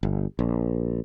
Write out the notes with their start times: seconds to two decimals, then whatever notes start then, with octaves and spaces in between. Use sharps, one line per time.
0.03 G1
0.39 A#1